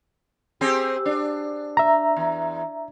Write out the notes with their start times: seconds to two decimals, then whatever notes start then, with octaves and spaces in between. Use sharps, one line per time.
0.61 C4 G4 G#4
1.06 D4
1.77 E5 A#5
2.17 E2